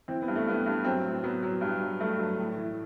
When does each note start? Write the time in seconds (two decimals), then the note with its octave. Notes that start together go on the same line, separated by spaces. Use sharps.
0.08 E3 C4
0.22 B3
0.28 G2
0.35 A3
0.47 G2 B3
0.66 G2
0.84 F#3 C4
1.04 A2
1.24 F#3 B3
1.43 F#3
1.61 G2
1.81 F#3
2.00 G2 A3
2.19 F#3
2.38 A2
2.58 E3